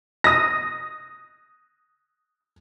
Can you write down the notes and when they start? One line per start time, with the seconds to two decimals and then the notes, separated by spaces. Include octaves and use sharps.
0.24 D#6 A#6